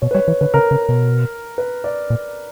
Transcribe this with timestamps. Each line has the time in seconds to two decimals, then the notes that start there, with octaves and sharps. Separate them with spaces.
0.02 B2 C#5
0.11 B4
0.14 G3 C#5
0.28 E3 B4
0.41 D3 B4
0.54 C#3 A#4
0.71 C#3
0.89 B2
1.58 B4
1.84 D5
2.10 A#2